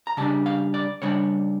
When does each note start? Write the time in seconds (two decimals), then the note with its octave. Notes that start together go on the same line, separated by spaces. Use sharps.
0.07 A#5
0.17 C#3 G3 D4 A5
0.46 F5
0.74 D5
1.02 C#3 G3 D4 C#5